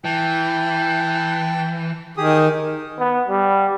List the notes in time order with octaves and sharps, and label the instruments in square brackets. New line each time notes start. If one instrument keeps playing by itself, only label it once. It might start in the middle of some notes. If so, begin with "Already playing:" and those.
[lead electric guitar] E3 [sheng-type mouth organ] G5 A5
[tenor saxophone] D#3 [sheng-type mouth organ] G4 G#4 D#6
[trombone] B3
G3